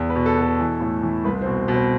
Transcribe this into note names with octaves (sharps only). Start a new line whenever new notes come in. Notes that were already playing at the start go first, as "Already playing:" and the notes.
Already playing: E2
B4
B2
A4
B2
A4
E3
A2
E3
C2 B4
C4
B2
B2
C4